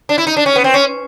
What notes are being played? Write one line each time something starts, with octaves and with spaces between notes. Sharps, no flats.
D4
E4
D#4
D4
C#4
B3
C4
C#4